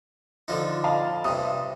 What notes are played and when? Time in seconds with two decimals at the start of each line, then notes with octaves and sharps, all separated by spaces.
0.48 D3 F3 D#4
0.84 D#5 F5 A5
1.25 G2 C3 D#6